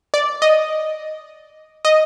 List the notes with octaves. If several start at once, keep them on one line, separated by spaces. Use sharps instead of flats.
D5
D#5
D#5